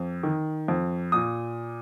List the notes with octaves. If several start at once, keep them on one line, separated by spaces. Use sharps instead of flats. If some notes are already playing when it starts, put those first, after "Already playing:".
Already playing: F2
D#3
F2
A#2 D#6